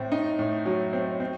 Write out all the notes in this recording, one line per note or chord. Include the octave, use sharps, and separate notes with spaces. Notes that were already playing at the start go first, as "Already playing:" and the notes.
Already playing: A2 C4
D#4
A2
F#3
C4
C4